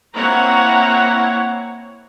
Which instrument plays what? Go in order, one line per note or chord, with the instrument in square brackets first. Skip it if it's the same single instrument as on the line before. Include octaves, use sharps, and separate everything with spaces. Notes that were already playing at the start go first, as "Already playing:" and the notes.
[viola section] A#3 C4 E4 C#5 F#5 A#5